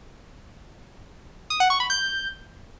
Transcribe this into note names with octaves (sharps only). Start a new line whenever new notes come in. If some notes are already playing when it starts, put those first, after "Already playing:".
D#6
F#5
C#6
B5
G6